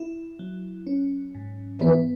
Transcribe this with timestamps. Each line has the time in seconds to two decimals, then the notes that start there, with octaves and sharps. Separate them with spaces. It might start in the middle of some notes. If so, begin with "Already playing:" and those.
Already playing: E4
0.39 F#3
0.87 C#4
1.35 G#2
1.82 E3 B3